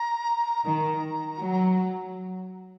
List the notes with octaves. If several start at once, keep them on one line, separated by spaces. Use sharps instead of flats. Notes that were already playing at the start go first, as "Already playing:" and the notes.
Already playing: A#5
D#3 A#5
F#3